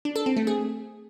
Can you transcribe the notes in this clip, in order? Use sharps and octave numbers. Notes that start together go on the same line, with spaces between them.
D4
A4
C4
A3
G#4